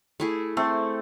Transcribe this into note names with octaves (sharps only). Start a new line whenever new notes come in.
A3 E4 G#4
A3 C4